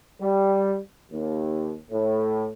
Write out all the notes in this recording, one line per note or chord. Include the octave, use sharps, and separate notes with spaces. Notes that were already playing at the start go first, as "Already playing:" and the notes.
G3
D#2
A2